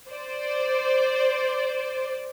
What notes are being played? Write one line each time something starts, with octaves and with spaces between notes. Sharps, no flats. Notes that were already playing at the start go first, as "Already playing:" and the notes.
C5 D5